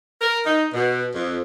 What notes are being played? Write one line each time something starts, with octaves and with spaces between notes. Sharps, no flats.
A#4
D#4
B2
F2